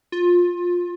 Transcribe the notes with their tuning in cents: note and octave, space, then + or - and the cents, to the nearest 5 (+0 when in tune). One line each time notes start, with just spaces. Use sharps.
F4 +20